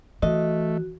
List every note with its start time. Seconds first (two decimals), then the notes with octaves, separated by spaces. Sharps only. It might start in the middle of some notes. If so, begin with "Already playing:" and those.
0.22 E3 A3 F#4 D#5